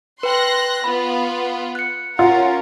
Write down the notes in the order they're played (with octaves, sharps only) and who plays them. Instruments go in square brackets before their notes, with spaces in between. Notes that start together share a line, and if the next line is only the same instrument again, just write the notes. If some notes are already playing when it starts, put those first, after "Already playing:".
[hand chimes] B4 G5 [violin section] C6 F#6 A#6
[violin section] B3 F4 [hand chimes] B5
[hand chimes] F#6 C#7
[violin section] C#4 A#4 [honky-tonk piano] F4 [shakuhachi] F#5